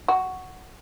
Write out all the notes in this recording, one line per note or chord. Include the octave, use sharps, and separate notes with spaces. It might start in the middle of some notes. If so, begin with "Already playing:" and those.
F#4